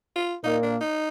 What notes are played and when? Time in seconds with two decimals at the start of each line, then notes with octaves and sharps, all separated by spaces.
0.16 F4
0.43 A#2 A#3 D#4
0.63 D4
0.81 D#4